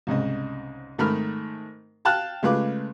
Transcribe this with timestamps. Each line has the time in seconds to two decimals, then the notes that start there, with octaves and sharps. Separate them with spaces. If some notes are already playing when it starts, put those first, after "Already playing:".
0.07 C2 G#2 C#3 D#5
0.98 G#2 D#3 A3 A#4 B5 F6
2.05 F5 G5 A5 F6 F#6
2.43 C#3 G#3 A3 F4 B4 D6